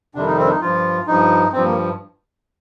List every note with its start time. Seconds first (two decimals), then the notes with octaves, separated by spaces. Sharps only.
0.15 F2 C3 D#3 G3 D4
0.27 D#4
0.38 C4
0.45 D4
0.50 D#4
0.61 G2 F3 F4
1.07 G2 F3 D#4
1.53 G2 F3 C4
1.64 A#3